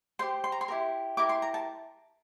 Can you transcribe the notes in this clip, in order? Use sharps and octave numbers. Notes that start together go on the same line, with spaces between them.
G4 C5 C6
C6
A#5
C6
E4 G4 A#4
E4 G4 A#4 D6
C6
A#5
A5